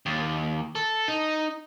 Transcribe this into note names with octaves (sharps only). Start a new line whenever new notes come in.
D#2
A4
D#4